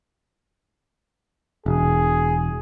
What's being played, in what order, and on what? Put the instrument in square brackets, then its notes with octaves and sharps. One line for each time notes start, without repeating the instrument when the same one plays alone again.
[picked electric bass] E1 [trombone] G#4